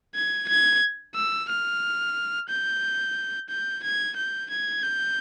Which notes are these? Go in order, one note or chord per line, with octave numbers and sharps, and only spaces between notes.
G#6
G#6
E6
F6
G6
G6
G#6
G6
G#6
G6